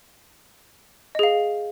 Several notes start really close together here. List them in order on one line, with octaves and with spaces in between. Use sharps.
D#5 G#4 F5